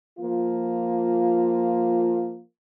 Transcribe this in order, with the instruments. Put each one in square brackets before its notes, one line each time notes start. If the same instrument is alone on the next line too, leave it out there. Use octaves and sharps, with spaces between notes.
[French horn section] F3 A#3 F4